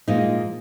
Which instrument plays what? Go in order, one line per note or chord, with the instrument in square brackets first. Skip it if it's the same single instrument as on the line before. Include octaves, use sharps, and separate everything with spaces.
[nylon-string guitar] A#2 F3 G#3 D#4